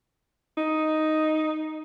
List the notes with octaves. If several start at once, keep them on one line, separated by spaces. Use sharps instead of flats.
D#4